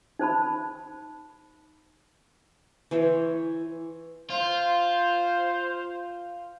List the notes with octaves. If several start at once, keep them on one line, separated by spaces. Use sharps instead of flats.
D#4 C5 A5 B5
E3 C5 C#5
F4 C5